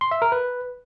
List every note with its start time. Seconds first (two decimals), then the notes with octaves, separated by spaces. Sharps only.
0.01 C6
0.11 E5
0.22 A#4
0.32 B4